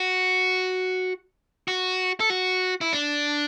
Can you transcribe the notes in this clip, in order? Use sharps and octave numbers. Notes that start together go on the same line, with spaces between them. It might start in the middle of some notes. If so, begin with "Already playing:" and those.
Already playing: F#4
F#4
A4
F#4
E4
D4